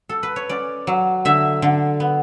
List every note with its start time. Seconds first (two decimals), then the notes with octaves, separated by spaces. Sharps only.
0.09 A4
0.23 B4
0.36 C#5
0.49 C#4 D5
0.87 F#3
1.25 D3 E5
1.62 D3
2.00 B3